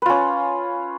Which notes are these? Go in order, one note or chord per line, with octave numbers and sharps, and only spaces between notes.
C#4 F4 B4